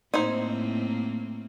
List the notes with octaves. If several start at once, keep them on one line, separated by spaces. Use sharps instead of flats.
A2 A#3 C4 D#4 E4 C5